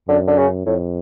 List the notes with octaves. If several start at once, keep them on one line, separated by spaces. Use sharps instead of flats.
F#2 D3
D3
C#3
F2 A2